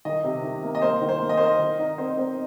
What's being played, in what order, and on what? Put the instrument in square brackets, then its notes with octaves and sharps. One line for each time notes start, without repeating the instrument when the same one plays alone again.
[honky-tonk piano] D#3 [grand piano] D#5
[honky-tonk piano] C3
D#3
A#3
[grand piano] D#5
[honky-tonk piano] A#3 [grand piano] C5
[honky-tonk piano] D#3
[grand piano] C5
[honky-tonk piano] A#3
[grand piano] D#5
[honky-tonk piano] A#4 [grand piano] C5
[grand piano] D#5
[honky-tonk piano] D#3
D#4
[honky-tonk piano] C4 [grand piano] C5
[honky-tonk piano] C4